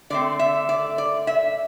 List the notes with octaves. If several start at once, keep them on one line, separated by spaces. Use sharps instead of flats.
D3 A3 C4 D5
E5
D5
D5
E5